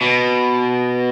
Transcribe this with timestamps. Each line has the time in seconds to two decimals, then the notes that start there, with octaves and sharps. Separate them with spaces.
0.01 B2